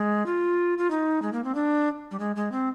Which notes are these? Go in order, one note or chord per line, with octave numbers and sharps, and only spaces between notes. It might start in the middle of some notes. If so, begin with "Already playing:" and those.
Already playing: G#3
F4
F4
D#4
G#3
A#3
C4
D4
G3
G#3
G#3
C4